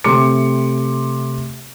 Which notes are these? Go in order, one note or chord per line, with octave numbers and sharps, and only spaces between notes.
C3 A3 G4 C6 D6 C#7